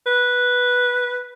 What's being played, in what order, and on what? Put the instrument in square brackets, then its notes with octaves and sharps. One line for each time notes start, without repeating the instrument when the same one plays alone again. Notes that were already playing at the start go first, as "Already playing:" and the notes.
[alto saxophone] B4